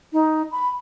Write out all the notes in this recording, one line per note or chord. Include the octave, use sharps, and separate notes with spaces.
D#4
B5